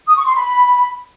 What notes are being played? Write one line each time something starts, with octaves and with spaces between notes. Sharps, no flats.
D#6
C#6
C6
B5